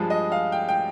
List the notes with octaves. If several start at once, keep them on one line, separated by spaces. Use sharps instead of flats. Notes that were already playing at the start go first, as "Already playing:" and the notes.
Already playing: G2 F3 G#3
D#5
F5
G5
G5